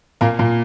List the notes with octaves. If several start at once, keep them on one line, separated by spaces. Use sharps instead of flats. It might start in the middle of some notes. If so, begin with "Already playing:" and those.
A#2 A#3
A#2 A#3